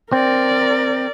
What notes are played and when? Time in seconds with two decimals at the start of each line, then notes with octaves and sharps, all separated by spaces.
0.12 C4 A#4 D5